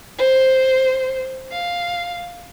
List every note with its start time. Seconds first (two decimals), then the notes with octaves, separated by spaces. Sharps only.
0.19 C5
1.51 F5